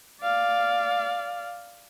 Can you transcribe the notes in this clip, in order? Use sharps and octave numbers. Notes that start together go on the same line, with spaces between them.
D5 F5